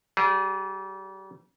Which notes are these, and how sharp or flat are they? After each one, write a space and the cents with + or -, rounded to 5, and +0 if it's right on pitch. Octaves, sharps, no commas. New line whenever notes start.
G3 -35 G#4 +0